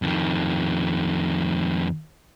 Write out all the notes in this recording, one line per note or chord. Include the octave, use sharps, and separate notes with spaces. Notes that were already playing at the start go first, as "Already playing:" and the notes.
F2 D#3